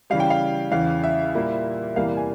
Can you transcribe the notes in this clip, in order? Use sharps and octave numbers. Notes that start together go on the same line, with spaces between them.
C#3 E3 G3 F5
G5
F5
E2 C#3 E3 F5
E5
A#2 G3 A#3 E4
E2 C3 E3 G3 A#3 F5
G#5